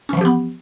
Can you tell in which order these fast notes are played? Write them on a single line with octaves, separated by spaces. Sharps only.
C#4 E3 F3 G4 B3